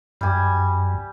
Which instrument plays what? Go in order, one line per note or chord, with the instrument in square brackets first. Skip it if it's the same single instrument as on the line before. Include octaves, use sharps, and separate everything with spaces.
[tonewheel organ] F#2 [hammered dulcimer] G3 G#5